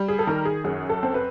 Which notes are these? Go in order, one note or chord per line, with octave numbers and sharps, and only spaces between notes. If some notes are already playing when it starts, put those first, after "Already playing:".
Already playing: G3
G#4
A4
D#3 A#4
G#4
F#2 G#4
A4
C4
B4